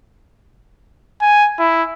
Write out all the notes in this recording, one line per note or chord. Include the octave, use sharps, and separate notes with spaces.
G#5
E4